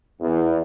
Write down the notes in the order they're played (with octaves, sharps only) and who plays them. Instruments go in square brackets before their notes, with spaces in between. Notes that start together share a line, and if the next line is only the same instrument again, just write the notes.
[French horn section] E2